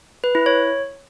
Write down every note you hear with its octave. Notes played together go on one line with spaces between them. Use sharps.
B4
E4
C#5